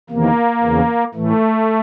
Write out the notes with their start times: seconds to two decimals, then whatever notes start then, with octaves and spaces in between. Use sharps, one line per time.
0.10 E2 C3 D#3 A#3
0.62 E2 C#3 E3
1.14 A2 E3 A3